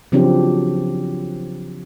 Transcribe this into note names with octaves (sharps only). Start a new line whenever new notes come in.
C#3 F3 F#3 C4 D4 G4